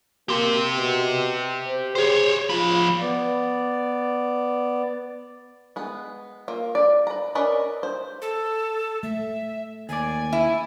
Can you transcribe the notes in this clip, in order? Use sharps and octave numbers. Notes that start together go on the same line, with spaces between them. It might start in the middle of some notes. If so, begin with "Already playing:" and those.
A#3 G4 C6
B2
C5
G#4 C5 C#5
F3 F4 B5
B3 D5
G#3 B3
A#3 F4
D5
B4 A#5
C#4 A#4 B4 D5 D#5
C5
A4
A3 E5
D#2 D5 G#5
E4